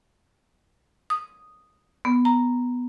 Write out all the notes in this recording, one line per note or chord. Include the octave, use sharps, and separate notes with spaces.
D#6
B3
A#5